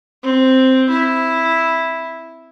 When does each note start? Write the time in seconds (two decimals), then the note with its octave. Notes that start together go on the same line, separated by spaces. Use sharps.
0.23 C4
0.89 E4